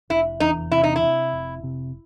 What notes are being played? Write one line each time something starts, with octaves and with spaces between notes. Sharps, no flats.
F1 E4
E2 D#4
C3 E4
D#4
E4
C3
F1
C3